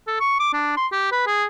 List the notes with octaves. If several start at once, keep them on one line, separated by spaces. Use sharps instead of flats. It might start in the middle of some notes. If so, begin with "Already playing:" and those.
A4
C#6
D6
D4
C6
G4
B4
G#4